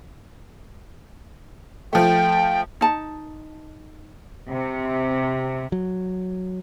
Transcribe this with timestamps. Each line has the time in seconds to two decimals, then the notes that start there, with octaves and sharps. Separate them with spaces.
1.93 F3 A3 G5
2.81 D#4 A5
4.48 C3
5.72 F#3